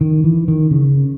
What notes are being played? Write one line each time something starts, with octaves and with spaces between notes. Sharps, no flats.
D#3
E3
D#3
C#3